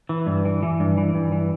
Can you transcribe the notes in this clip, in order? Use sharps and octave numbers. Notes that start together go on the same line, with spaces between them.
E3
G2
E3
E3
G2
E3
G2
E3